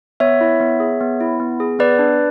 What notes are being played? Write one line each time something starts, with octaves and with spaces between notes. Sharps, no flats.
B3 C#5 E5
E4
B3
G#4
B3
E4
B3
G#4
B3 B4 D5
D4